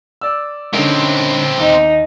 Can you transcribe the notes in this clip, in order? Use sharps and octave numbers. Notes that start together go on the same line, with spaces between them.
D5 E6
D3 C4 C#4 D#4 A#4
D#2 D#4